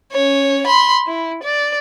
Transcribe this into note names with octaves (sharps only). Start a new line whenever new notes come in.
C#4 C#5
B5 C6
E4
D5